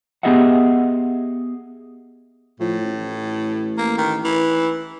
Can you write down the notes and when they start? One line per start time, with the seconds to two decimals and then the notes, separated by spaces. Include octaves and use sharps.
0.23 B3 G4 G#4 D#5 E5 F#5
2.60 A2 F3
2.84 A1
3.78 A#3
3.98 D#3
4.25 E3